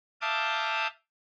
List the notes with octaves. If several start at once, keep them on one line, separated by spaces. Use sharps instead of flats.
E5 F5 A5 D6 D#6 G6